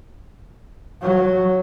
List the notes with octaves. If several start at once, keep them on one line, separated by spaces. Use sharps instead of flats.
F#3